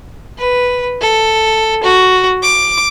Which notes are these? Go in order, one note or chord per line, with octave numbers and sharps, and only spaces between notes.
B4
A4
F#4
D6